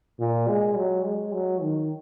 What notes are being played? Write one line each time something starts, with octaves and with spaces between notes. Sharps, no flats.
A#2
G#3
F#3
G#3
F#3
D#3